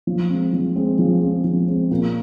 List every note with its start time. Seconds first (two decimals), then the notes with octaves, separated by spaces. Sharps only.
0.07 F3
0.30 G#3 C4
0.53 F3
0.76 G#3 C4
0.99 F3
1.21 G#3 C4
1.45 F3
1.68 G#3 C4
1.91 A#2